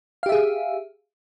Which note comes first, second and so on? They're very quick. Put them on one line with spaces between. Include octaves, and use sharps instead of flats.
F5 G4 E5 G#4